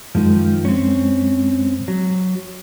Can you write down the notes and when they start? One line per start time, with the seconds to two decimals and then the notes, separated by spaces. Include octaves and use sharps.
0.15 F#2 D#3 F3 G#3
0.65 C4 C#4
1.88 F#3